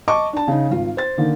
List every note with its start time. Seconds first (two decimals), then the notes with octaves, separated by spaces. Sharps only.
0.08 D#5 A5 C#6 D6
0.33 D4 A5
0.48 C#3 D#4
0.70 G#1 F4
0.97 C5 A6
1.18 D3 D#3 A#3